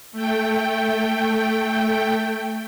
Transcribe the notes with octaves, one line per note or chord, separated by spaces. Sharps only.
A3 G5